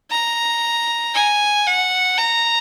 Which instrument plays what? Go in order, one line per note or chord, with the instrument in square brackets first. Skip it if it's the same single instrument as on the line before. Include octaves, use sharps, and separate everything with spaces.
[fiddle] A#5
G#5
F#5
A#5